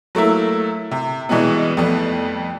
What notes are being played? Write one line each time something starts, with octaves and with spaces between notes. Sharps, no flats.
F#3 A3 A#3 E4
C3
B2 E3 G3 G#3 B3
F2 G3 A3 B3